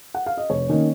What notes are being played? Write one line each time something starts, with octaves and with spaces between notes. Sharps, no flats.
F#5
F5
D#5
F1 C#5
D#3 A#3 C#4